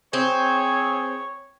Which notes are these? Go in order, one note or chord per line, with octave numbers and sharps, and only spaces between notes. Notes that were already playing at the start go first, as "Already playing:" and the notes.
C4 G#4 C#5